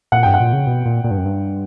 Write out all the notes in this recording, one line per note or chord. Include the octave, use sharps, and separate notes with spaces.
A#2 F#5
G2 G5
F#5
A#2
C#3
B2
A#2
A#2
G2
F#2
G2